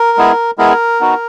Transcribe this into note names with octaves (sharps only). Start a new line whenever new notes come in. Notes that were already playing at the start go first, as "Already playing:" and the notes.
Already playing: A#4
G#3 B3 E4 G#4
G#3 B3 E4 G#4 A#4
B3 D#4 F#4